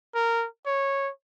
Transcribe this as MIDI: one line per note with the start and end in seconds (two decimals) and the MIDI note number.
0.15 0.46 70
0.66 1.10 73